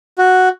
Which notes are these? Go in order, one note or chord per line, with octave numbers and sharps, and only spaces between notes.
F#4